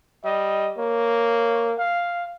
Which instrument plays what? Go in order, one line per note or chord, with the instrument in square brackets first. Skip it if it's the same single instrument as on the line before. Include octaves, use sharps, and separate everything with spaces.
[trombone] G3 [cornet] D#5
[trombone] A#3 [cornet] C#5
[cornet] F5